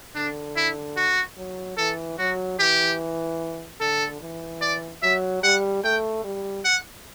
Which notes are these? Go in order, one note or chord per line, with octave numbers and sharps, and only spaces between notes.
D3 D4
E4
F#4
F#3
E3 A4
F#3 F#4
E3 G4
D3 A4
E3
D5
F#3 E5
G3 F#5
A3 G5
G3
F#5